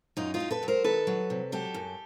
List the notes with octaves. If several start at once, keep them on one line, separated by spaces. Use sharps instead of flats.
F#2 D#4 F4
D#4 F4
F#2
A4 B4
F#3
A#4 C5
D#3 A4 B4
F#3
C3
F#3 G4 A4
F#2